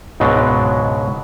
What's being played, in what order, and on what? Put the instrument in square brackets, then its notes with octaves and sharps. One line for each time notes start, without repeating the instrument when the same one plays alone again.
[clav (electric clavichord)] C#2 G#2 B2 F#3 G#3 D4